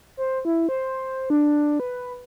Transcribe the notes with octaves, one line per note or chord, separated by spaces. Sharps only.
C5
E4
C5
D4
B4